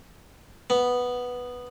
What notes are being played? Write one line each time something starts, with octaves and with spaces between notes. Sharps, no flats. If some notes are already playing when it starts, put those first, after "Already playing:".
B3